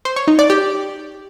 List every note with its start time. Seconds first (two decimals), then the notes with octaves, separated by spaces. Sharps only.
0.05 C5
0.16 C#5
0.28 D#4
0.39 D5
0.50 G4